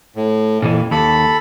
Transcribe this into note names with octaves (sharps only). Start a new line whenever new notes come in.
A2
F2 A#2 E3
D#2 A4 B5